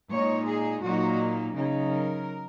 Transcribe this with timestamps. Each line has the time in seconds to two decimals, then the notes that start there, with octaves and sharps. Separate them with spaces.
0.10 A#2 G#3 D#4 C#5
0.47 G#4
0.82 A#2 F#3 A#3 D#4 F#4
1.55 C#3 F#3 D#4
1.90 A#4